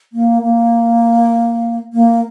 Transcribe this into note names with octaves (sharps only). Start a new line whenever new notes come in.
A#3
A#3
A#3